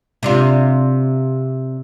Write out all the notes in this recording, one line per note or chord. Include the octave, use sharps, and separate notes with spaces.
C3 D4 F4